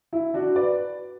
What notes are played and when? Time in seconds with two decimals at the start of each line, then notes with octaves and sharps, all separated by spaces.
0.13 E4
0.34 D4 F#4
0.56 B4 D5